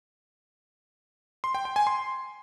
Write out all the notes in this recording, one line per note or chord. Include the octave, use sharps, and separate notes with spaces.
C6
G5
G5
G#5
C6